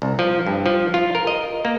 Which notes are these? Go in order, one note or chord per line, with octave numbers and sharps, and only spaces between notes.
C2
F3
G2
F3
F4
A#4
D#5
A#3